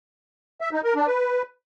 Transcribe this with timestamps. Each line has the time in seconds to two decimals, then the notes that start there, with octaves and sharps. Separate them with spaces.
0.61 E5
0.73 D#4
0.84 A#4
0.95 D4
1.07 B4